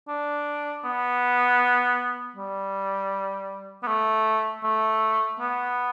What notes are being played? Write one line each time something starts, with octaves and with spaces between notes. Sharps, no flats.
D4
B3
G3
B3
A3
A3
B3